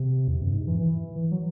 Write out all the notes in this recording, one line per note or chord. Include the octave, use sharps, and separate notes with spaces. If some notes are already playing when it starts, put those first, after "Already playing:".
Already playing: C3
E2
F#2
G#2
E3
E3
F#3